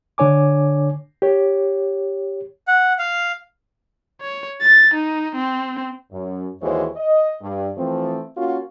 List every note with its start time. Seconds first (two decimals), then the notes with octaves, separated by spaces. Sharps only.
0.18 D3 D4 C#5 G#5 D6
1.22 G4 C#5
2.68 F#5
2.99 F5
4.22 C#5
4.62 A6
4.94 D#4
5.36 C4
6.12 F#2
6.62 D#2 E3 G#3 F#4 C5 C#5
6.97 D#5
7.42 G2
7.77 E3 F3 A3 C4
8.37 A#3 C#4 F4 F#4